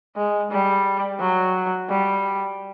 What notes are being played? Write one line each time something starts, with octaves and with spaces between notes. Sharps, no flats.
G#3
G3
F#3
G3